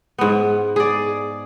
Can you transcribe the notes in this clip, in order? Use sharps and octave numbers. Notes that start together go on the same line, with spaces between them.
G#2 B3
G#4 D5